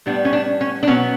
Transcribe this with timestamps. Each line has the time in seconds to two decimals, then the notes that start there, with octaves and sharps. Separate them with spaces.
0.06 A2 G3 B3 D4
0.25 C#4
0.33 D4
0.61 C#4
0.83 D4
0.87 B2 F#3 B3 C#4